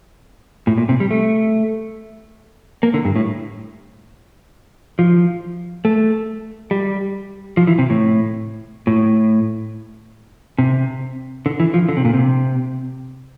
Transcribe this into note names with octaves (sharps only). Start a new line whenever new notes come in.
A2
A#2
C3
G3
A3
A#3
D3
G2
A2
F3
A3
G3
F3
E3
C3
A2
A2
C3
D3
E3
F3
D3
C3
A#2
C3